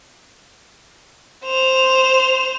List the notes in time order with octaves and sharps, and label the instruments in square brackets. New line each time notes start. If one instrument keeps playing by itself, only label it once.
[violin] C5 F7